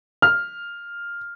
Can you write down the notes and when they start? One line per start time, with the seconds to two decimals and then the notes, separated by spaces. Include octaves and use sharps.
0.22 F6